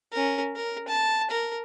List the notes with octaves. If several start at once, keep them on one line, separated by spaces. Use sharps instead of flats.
C#4 A#4
A#4
A5
A#4